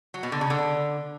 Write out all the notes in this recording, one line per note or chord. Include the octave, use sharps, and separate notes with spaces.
F#3
B2
D3
C#3
D3